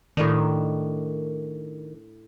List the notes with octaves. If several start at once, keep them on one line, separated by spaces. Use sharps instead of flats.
A2 D#3 D4